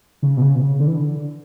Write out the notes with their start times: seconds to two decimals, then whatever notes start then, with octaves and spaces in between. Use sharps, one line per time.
0.22 C#3
0.37 B2
0.42 C#3
0.55 B2
0.61 C#3
0.80 D3
0.87 E3
0.95 D3